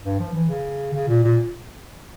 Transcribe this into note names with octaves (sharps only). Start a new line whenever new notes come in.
G2
F3
E3
C#3
C#3
A#2
A#2